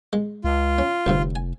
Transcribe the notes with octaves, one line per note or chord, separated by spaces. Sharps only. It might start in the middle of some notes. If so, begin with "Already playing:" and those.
G#3
C#2 F4
C#4
F1 D2 G2 C3
G#5